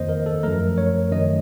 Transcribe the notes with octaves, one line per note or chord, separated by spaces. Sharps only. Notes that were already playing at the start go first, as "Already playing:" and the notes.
Already playing: F2 D#3 A#3 C5 D#5
A#4
A4
F#2 F3 A3 A#4
C#5
F#2 D#3 A3 D#5